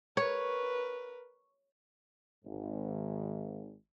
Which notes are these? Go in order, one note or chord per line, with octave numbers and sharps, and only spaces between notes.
A#4 B4 C#5
G#1 G#2